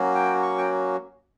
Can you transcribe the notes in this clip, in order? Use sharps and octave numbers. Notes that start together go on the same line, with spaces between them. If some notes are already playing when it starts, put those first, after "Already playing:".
Already playing: F#3 A#3 C#4 F#4
G5
C#6
G5